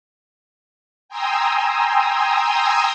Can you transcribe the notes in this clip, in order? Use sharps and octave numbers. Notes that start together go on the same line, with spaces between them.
G5 G#5 A#5 C6 D#6 E6